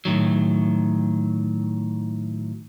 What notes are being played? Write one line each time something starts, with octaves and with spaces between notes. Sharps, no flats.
A2 D#3 F#3